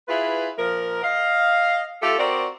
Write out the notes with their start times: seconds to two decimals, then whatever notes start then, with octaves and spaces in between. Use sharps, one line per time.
0.08 E4 F4 G#4 B4
0.58 A#2 F3 A#4
1.03 D#5 F5
2.01 A3 F4 G4 A4
2.19 C4 F#4 A#4 D5